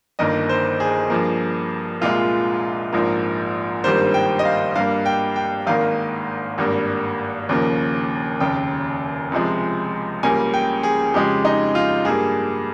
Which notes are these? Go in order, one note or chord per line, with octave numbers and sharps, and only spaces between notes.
G1 G2 D#3 A#3 D#5
C5
G#4
G2 F3 A#3
C2 A#2 G#3 F4
A#1 G#2 F3 A#3
G#1 G2 D#3 G3 A#3 C5
G5
D#5
F5
G2 G3 A#3 F5
G5
G5
G#1 G#2 D#3 A#3 F5
G#1 G2 G3 A#3
D#2 C#3 F3 A#3
F1 D#2 C#3 G5
C#2 C3 F3 G#3
C#2 C#3 G3 A#3 G#5
G5
G#4
F2 C#3 G#3 G4
D#4
F4
G2 G3 A#3 G#4